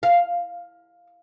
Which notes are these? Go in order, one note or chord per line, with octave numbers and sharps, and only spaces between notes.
F5